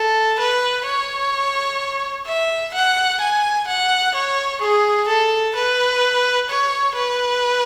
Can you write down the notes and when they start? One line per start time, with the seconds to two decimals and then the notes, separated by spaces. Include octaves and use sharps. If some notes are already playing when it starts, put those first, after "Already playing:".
Already playing: A4
0.39 B4
0.86 C#5
2.27 E5
2.74 F#5
3.20 G#5
3.68 F#5
4.14 C#5
4.62 G#4
5.08 A4
5.55 B4
6.49 C#5
6.95 B4